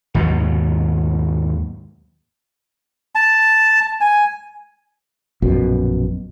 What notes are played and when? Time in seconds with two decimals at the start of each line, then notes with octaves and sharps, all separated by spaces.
0.14 D#2 G#2 B2 F#3
3.15 A5
4.01 G#5
5.42 A#1 F#2 B2